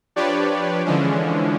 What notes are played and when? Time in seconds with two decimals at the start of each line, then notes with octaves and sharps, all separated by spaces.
0.16 F3 D4 G4 B4 C#5 D5
0.85 D3 E3 F3 G#3 C#4 D4